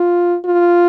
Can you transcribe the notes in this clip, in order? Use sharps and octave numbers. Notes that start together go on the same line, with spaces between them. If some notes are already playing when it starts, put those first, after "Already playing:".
Already playing: F4
F4